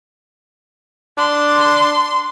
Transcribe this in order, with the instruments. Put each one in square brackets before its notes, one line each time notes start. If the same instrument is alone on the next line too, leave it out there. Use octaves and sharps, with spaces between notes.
[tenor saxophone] D4 [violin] C6